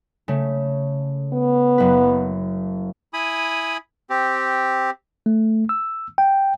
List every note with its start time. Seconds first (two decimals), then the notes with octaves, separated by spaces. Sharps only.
0.28 C#3 A3
1.33 B3
1.78 F#1 B4
3.13 E4 G#5 B5 D#6
4.10 C4 G4
5.26 A3
5.69 E6
6.18 G5